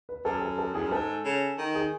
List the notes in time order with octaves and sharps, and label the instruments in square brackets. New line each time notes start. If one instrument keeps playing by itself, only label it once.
[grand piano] B4
[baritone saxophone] F#2 [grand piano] A4
[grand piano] A4
A4
[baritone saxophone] E2 [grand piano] G#4
[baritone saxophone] F#2
[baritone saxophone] G#2 [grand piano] A4
[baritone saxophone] C#3
D#3
[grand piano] G#4